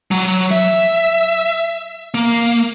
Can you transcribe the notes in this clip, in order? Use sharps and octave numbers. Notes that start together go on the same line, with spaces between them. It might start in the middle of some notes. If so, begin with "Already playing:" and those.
F#3
E5
A#3